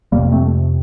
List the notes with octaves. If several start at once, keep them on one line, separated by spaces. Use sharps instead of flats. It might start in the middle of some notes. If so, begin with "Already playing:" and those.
F2 C3 G3 A#3
A3 C4